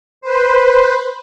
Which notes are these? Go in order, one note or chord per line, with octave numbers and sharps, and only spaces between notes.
B4 C5